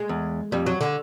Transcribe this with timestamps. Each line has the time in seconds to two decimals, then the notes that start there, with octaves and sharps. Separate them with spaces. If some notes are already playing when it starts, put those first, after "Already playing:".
Already playing: G#3
0.09 E2
0.52 F2 G3
0.66 F#3
0.81 D3